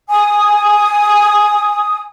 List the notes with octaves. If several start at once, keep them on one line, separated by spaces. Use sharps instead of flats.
G#5 D#6